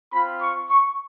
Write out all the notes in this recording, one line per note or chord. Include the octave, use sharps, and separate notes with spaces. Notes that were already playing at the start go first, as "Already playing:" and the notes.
C4 F4 B5
C#6
C#6